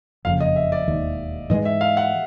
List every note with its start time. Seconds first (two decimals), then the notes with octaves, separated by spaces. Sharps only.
0.25 F#1 F2 C#3 F5
0.40 D#5
0.56 E5
0.72 D5
0.87 E1 D#2 D#3
1.50 G#2 E3 G#3 D#5
1.65 E5
1.81 F5
1.97 F#5